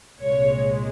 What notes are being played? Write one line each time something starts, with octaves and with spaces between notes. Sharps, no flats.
C2 A#2 G#3 C#5